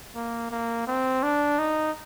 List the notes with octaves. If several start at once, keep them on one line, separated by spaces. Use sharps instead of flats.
A#3
A#3
C4
D4
D#4